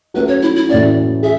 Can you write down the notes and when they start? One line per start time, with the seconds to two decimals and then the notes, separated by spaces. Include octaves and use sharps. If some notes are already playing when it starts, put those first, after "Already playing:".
0.14 F#3 A3 C#4 B4
0.28 C#5
0.42 E4
0.56 E4
0.69 A2 E3 A3 C#4 F#4 D5
1.23 G#4 E5